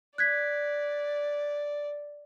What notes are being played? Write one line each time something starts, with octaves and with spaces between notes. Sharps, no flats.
D5 F#6 G#6 B6